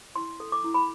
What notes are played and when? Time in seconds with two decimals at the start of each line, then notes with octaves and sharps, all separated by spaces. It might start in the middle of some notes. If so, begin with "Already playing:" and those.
0.16 E4 C6
0.40 A4
0.52 D6
0.64 E4
0.74 B5